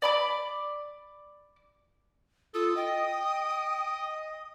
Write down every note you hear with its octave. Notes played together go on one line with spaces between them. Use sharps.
D5 B5 D6
F4 A4 D#6
D#5 G5